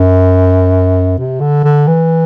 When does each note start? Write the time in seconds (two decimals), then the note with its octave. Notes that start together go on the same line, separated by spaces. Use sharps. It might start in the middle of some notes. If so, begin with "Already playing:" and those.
Already playing: F#2
1.18 C3
1.40 D3
1.64 D3
1.87 E3